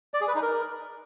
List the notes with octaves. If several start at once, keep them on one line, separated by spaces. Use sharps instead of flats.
D5
G#4
B4
D#4
A#4